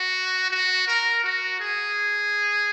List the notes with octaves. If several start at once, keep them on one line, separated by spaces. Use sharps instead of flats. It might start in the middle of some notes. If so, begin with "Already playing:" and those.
Already playing: F#4
F#4
A#4
F#4
G#4